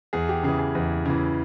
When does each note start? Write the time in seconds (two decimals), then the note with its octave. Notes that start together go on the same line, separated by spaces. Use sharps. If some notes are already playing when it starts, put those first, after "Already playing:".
0.13 E2 G#4
0.29 G4
0.43 C#3 E3 G#4
0.59 G#4
0.75 E2
1.06 C#3 E3